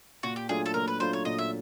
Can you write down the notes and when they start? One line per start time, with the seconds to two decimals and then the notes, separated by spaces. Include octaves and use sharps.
0.23 A#2 F#4
0.36 G4
0.49 F#3 A3 D4 F4 G#4
0.66 A4
0.74 A#2 A#4
0.88 B4
1.00 F#3 A3 D4 F4 C5
1.13 C#5
1.25 A#2 D#5
1.38 E5